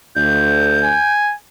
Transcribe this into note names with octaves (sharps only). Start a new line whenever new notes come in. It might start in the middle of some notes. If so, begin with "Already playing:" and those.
D2 G6
G#5